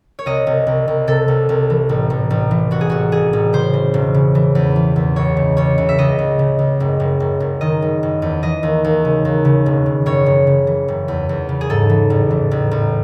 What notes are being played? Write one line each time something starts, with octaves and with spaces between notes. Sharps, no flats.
C#5
C2 D#5
C2
C2
C2
C3 A4
C2
C2
E3
A1
A1
A1
E3
A1 F#4
G#4
A1 F#4
A1 G#4
A1
C#3 C5
E3
E1
C#3
E3
E2
E3
E2
C#2 C#5
C#3
C#2 C#5
C#2
E5
C#2 D#5
C#2
C#3
C#2
F#1
F#1
F#1
F#1
D#3 D#5
F#1
F#1
E2
E3 D#5
D#2
D#2
C#3
D#2
C#3
E1
C#3
F#1 C#5
F#1
C#3
E3
F#1
E2
E2
C#3
G#4
G#2 A4
E3
A1
E3
A1
A1